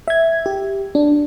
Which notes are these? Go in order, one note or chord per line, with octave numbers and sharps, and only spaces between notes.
E5 G#6
G4
D4